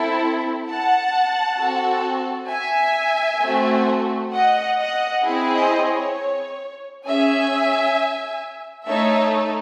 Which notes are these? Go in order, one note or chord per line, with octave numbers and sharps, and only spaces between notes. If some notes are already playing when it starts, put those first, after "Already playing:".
Already playing: C4 E4 A4
F#5 A5
C4 F#4 A4
E5 G#5
A3 C4 F#4
D#5 F#5
D#5 F#5
C4 E4 G#4
C5 D#5
C#5
C#4 G#4 E5 G#5
A3 D#4 A4 C#5 E5